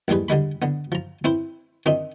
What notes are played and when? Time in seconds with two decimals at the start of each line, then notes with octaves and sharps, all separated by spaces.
0.08 A1 D#2 G3 G#4 B4
0.29 D3 G3 G#3 B5
0.62 D3 B3
0.92 F3 A#5
1.24 C4 E4 B4 C5
1.86 D#3 C4 D4 D#4 E5